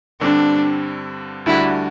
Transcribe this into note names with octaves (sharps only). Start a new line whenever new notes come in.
G2 D3 G3 C4 D4
D2 D3 G3 D4 E4 F#4